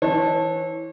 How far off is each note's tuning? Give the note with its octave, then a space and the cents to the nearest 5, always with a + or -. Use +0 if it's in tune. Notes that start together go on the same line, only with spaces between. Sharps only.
E3 -15 C#5 -35 A5 +0